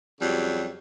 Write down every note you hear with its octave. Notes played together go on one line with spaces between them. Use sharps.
F2 C#3 F#3 G3